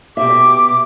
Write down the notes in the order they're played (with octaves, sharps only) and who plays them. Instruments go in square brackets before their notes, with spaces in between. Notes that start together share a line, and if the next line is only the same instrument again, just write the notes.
[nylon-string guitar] B2 G4 E5 [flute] D6